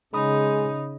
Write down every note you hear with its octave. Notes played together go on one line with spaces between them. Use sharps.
C#3 G#3 D#4 B5 D#6